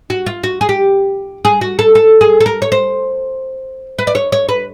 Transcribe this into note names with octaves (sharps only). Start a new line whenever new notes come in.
F#4
F4
F#4
G#4
G4
G#4
F#4
A4
A4
G#4
A4
A#4
C#5
C5
B4
D5
C#5
C#5
B4